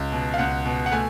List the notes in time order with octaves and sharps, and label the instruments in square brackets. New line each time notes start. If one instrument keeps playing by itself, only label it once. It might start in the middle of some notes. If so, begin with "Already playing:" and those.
Already playing: [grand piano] C#2
B2
F5
C#2 F#5
B2
F#5
A3 G#5